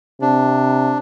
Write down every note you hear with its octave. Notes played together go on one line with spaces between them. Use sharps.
C3 D4